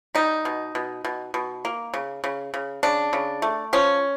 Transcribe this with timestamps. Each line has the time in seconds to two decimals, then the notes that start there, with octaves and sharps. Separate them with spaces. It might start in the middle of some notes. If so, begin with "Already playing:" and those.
0.15 G3 D#4
0.45 B2
0.75 B2
1.05 B2
1.34 B2
1.65 A#3
1.94 C#3
2.24 C#3
2.54 C#3
2.83 C#3 D4
3.13 C#3
3.42 A3
3.73 F3 C#4